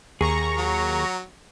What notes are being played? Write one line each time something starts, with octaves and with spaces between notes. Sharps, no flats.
D#2 G#4 A#5 C#6
F#3